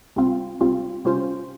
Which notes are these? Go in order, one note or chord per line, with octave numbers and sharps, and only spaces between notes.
C#2 C3 G3 C4 F4
C#2 C3 G3 C4 F4
C3 G3 C#4 F4 C5